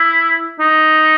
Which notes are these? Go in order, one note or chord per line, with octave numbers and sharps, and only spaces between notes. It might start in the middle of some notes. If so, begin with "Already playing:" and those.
Already playing: E4
D#4